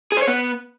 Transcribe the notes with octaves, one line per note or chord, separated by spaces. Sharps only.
G#4
C5
C#5
B3